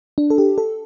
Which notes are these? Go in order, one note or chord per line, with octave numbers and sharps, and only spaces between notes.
D4
A4
G4
A4